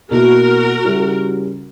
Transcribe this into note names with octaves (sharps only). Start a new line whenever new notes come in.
B2 A#3 E4 F#4 A#4
C#3 G3 C#4 E4